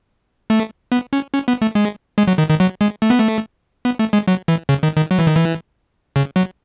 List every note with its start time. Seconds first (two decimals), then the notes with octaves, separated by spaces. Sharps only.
0.50 A3
0.92 B3
1.13 C#4
1.34 C#4
1.48 B3
1.62 A3
1.75 G#3
2.18 G#3
2.28 F#3
2.38 D#3
2.49 D#3
2.60 F#3
2.81 G#3
3.02 A3
3.10 B3
3.19 A3
3.85 B3
3.99 A3
4.13 G#3
4.28 F#3
4.48 E3
4.69 C#3
4.83 D#3
4.97 D#3
5.11 F#3
5.19 E3
5.27 D#3
5.35 E3
6.16 C#3
6.36 F#3